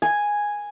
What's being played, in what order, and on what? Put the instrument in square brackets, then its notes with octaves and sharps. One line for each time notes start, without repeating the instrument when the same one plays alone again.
[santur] G#5